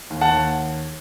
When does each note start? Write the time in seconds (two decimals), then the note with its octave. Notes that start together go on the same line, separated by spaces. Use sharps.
0.10 D#2
0.21 F#5 A5
0.31 D#2